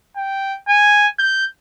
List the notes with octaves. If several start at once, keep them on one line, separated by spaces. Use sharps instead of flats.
G5
G#5
G6